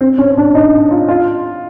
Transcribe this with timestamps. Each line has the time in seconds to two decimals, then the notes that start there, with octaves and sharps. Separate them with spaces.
0.01 C4
0.18 C#4
0.31 C#4
0.37 D4
0.55 D#4
0.91 F4
1.09 F4